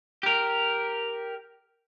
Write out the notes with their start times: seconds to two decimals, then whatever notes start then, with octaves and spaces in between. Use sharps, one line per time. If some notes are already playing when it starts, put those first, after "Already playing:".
0.23 G4 A#4